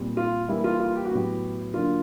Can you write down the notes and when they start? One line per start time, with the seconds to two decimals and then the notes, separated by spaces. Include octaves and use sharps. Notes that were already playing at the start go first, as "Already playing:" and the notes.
Already playing: A#2 G3 C4
0.17 F4
0.48 E3 G3 A#3 E4
0.64 F4
0.80 F4
0.96 G4
1.05 F#4
1.11 A2 F#3 B3 G4
1.74 D3 F#3 A#3 D4 F4